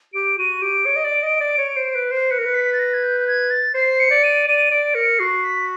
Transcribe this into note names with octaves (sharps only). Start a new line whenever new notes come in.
G4 D7
F#4 D#7
G4 D7
C#5
D#5
D5
D#5
D5
C#5
C5
B4
C5
B4 C#7
A#4
B4
B6
A6
A#6
G#6
G6
G6
G#6
A6
C5 C7
C#7
D5
D#7
D5 D#7
D5 D7
A#4 C#7
F#4 C7
B6